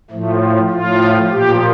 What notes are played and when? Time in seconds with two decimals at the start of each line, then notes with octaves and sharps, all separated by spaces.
0.11 A2 F3 A3
0.70 A2 F3 F4
1.30 A#2 F3 G4